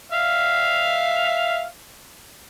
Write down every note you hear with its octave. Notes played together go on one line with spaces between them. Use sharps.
E5 F5 F6